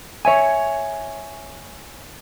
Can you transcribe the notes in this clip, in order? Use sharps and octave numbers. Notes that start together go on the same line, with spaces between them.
C#5 E5 G#5